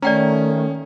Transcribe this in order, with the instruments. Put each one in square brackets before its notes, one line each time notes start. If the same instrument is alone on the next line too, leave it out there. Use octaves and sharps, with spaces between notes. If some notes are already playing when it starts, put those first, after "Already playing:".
[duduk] D#3 [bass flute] A3 [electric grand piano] C#4 [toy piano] D5 G5 A#5